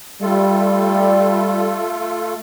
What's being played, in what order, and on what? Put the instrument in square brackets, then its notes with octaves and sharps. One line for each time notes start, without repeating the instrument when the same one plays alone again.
[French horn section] G3 [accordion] A3 F4 A4